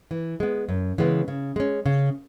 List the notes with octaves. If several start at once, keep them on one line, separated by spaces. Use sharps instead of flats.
E3
G#3 B3
F#2
C#3 E3 G#3 B3
C#3
G#3 C#4
C#3